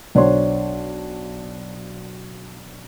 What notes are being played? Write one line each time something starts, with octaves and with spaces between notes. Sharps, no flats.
B1 D4 C5 C#5 C6